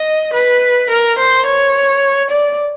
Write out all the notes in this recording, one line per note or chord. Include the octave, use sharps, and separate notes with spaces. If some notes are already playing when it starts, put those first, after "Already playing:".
Already playing: D#5
B4
A#4
C5
C#5
D5